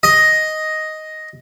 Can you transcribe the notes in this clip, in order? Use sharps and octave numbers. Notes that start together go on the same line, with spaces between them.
D#5